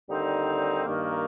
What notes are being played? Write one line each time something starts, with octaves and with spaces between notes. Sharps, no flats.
D#2 D3 G3 C4 D#4
G2 D#3 A#3